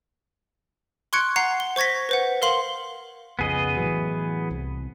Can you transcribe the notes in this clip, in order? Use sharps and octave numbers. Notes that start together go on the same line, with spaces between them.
C6 C#6 F#6 G#6 C#7 D7
F#5 A#5 C7
G7
C5 C#6 G#6 A#6 B6
B4 C5 F#5
A#4 F5 C6 F#7 G7
B1 F2 C#3 B3 G#4 D#5
A2 E3 F#3
C2